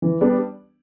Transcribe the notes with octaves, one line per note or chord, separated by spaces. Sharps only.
E3
G3 B3 D4